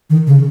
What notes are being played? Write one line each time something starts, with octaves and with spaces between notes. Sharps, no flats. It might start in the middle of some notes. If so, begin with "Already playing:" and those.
D#3
C#3